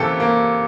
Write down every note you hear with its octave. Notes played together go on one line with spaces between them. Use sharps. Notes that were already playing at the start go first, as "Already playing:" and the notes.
Already playing: C3 E3 A#3 C#4 G4 A4
A#3